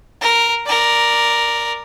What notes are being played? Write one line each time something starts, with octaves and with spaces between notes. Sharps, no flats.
A#4
A#4 D5